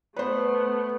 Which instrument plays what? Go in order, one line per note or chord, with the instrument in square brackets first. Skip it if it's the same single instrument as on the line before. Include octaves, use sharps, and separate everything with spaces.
[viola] A3 B3 [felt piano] B4 C5